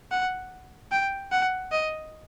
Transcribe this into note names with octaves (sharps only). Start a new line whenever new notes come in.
F#5
G5
F#5
D#5